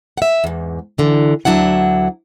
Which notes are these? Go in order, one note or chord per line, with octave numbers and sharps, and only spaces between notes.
E5 F#5
E2 G#2
D3 E3
D2 F#3 D4 E4 F#5